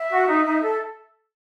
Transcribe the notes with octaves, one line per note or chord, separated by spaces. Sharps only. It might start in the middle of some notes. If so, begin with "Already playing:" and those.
Already playing: E5
F#4
D#4
D#4
A4